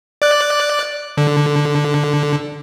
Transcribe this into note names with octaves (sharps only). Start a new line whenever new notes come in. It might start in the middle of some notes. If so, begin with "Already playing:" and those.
D5 F#6
D3